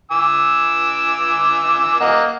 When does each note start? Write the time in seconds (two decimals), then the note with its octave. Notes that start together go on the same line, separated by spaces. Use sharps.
0.11 G#5 D6 E6
2.01 A#3 D#5 F#5